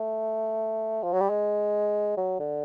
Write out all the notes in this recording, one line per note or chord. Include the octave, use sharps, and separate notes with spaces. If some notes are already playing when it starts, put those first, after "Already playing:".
Already playing: A3
F3
F#3
G3
G#3
F#3
D3